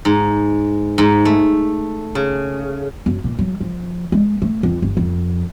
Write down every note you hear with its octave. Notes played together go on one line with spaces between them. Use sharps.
G#2
G#2
A3
C#3
F#2
A#2
F#3
F3
G#3
A3
F2
G1
F2